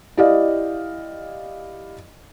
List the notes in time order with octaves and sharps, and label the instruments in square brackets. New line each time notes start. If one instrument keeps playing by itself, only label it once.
[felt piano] E4 G4 D5 D#5 F5